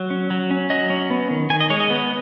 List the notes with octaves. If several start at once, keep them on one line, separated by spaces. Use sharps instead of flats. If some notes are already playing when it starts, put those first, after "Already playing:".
Already playing: F#3
C#4
F#3
C#4
F#3 D#5
C#4
B3
D#3
D#3 G#5
D#5
G#3 C#5
D#5
B3